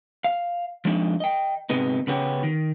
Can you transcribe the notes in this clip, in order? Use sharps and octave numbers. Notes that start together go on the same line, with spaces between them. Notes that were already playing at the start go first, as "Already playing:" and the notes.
F5
F3 G#3 D4 D#4
D#5 G5
G#2 C3 G#3 B3 D#4
C#3 B3 C#4 G4
D#3